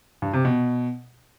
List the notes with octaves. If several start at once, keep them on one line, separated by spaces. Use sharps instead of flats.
G2
C3
B2